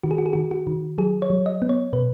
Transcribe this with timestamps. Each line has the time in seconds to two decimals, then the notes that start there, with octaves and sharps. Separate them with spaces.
0.03 D#3 F#4
0.11 G#4
0.18 F#4
0.26 G#4
0.33 D#3 F#4
0.51 F#4
0.67 D#3
0.98 F#3 G#4
1.22 C#5
1.30 F#3
1.46 D#5
1.62 B3
1.69 C#5
1.93 B2 B4